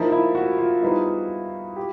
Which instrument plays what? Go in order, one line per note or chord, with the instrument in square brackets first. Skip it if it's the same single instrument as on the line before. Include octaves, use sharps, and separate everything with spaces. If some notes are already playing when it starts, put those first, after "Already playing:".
Already playing: [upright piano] F3 A#3 D#4 [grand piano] E4
[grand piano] E4
F#4
F4
[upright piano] G3 B3 D#4 G#4 C5 [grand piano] E4
[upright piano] G4